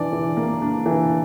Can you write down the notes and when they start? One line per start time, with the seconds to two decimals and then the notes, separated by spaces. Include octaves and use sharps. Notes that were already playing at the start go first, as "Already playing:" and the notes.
Already playing: E3 D4 D5
0.13 E3
0.37 A#3
0.62 D4
0.86 E3